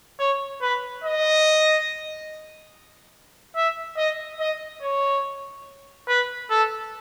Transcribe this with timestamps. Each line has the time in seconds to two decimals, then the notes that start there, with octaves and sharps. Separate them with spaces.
0.19 C#5
0.62 B4
1.04 D#5
3.56 E5
3.98 D#5
4.40 D#5
4.82 C#5
6.08 B4
6.50 A4